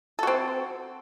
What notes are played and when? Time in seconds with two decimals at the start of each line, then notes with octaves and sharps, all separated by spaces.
0.19 A4
0.23 F#4
0.27 C4